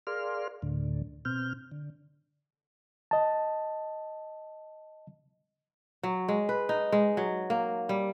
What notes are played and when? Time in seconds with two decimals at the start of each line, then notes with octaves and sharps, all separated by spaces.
0.07 G#4 A#4 D5 F5 C6 F6
0.62 D2 A2 D3
1.25 B2 C4 F6 G6
1.71 D3
3.11 D#5 A5
6.03 F#3
6.28 G#3
6.49 B4
6.69 D#4
6.92 G#3
7.17 F#3
7.50 A#3
7.89 G3